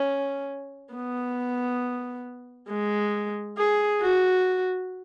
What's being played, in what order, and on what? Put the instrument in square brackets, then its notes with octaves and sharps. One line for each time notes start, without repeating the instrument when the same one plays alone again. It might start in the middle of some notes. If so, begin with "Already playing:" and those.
Already playing: [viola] C#4
B3
G#3
G#4
F#4